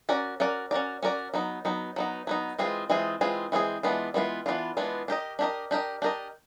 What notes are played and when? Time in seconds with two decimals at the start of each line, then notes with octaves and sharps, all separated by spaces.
0.09 C#4 F#4 A#4 D5
0.40 C#4 F#4 A#4 D5
0.71 C#4 F#4 A#4 D5
1.03 C#4 F#4 A#4 D5
1.34 F#3 B3 D#4
1.65 F#3 B3 D#4
1.96 F#3 B3 D#4
2.27 F#3 B3 D#4
2.59 E3 G#3 C4 F4 G#4
2.90 E3 G#3 C4 F4 G#4
3.21 E3 G#3 C4 F4 G#4
3.52 E3 G#3 C4 F4 G#4
3.83 E3 G#3 B3 D4 F4
4.14 E3 G#3 B3 D4 F4
4.46 E3 G#3 B3 D4 F4
4.77 E3 G#3 B3 D4 F4
5.08 D4 G4 A#4 D#5
5.39 D4 G4 A#4 D#5
5.71 D4 G4 A#4 D#5
6.02 D4 G4 A#4 D#5